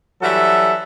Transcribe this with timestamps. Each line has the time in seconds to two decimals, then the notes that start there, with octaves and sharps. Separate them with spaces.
0.21 E3 F#3 G3 F#4 A4 E5